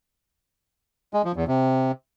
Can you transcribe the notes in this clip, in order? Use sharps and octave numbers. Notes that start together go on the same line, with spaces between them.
G#3
F3
E2
C3